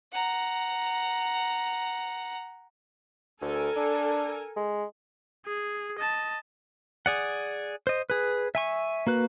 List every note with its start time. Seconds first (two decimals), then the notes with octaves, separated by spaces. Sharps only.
0.13 F#5 A#5
3.42 D2 A4 A#4 G#5
3.76 D4
4.56 G#3
5.45 G#4
5.99 D#5 A5
7.06 G#4 D5 F#5
7.87 C5 D#5
8.10 G#4 B4
8.55 E5 G#5 C#6
9.07 A#3 F#4 B4